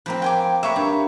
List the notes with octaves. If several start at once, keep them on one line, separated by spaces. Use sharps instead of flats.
F3 A#3 C4 B4
G5 G#5 D6
A#3 B4 C#5 E5
G2